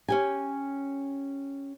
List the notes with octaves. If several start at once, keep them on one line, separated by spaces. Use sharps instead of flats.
C#4 G4 G#5